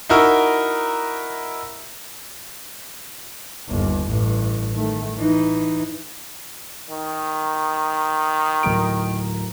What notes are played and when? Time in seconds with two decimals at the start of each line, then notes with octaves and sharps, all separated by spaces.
0.09 D#4 E4 F#4 A#4
3.69 G1 D#2
4.06 A1 G2
4.74 D#3 A3
5.18 E3 D#4
6.91 D#3
8.63 D1 A#4 D7